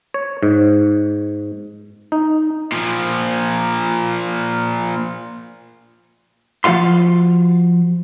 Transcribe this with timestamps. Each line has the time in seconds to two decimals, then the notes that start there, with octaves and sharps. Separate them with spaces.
0.14 C#5
0.43 G#2
2.12 D#4
2.72 A#2 F3
6.64 F3 F4 F#4 F5 C6